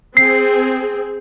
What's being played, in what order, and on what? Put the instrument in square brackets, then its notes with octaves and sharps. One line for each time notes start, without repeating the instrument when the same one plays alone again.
[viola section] C4 G#4 [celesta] C7